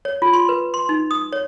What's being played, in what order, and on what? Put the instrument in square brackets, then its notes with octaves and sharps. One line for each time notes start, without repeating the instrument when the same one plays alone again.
[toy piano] C#5
F4
C6
B4
C6
D#4
D#6
C#5